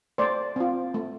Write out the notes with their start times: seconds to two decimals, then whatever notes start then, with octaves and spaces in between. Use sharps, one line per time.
0.18 A3 C5 D5
0.56 C4 F4
0.94 A3